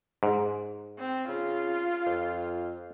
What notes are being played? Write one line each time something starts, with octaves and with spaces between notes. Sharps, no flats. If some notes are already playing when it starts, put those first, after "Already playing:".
G#2
C4
C#3 F4
F2